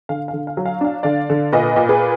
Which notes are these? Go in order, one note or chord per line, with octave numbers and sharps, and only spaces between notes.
D3 F5
F5
D3
F5
F#3
F5
D4 F5
D3 D5 F5
D3
A#2 B4 D#5
A#2
G#4 B4